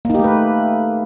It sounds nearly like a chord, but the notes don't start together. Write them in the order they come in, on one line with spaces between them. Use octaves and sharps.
A#3 D#4 G4 A3 B4